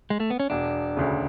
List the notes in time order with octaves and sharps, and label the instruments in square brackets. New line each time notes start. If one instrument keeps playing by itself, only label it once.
[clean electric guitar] G#3
A3
B3
C#4
[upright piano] E1 [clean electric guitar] D4
[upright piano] D2 C#3